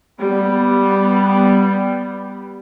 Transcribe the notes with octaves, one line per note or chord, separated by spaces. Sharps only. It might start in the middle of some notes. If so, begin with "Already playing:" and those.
G3 B3